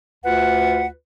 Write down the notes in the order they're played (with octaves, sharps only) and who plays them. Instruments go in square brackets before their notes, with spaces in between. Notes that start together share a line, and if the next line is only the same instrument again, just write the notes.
[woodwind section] D2 F4 B4 F#5